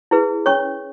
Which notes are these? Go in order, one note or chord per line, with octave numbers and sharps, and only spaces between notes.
E4 G#4 B4
C#4 C#5 C#6